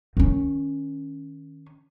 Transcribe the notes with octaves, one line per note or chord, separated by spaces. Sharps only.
D#3 C#4